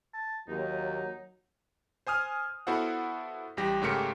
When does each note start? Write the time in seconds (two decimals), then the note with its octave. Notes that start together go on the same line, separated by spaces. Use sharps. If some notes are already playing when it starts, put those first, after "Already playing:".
0.13 A5
0.48 D#2 F#3 D#4
2.07 C5 G#5 D#6 F6
2.67 B3 E4 F#4 A4 C5 F#5
3.57 A1 G3 G4 A#6
3.82 G#2 C#3 A3 G4 A#4 C#7